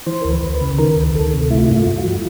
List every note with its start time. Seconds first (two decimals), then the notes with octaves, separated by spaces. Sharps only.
0.06 E3 C5
0.22 D2 A#4
0.31 B4
0.43 D2
0.55 B4
0.61 C#3
0.78 D#3 A#4
0.96 D2
1.14 D2 A4
1.33 C3
1.50 A3 E4
1.58 F4
1.65 E4
1.69 G2 F4
1.87 G2 F4
1.99 F#4
2.04 E3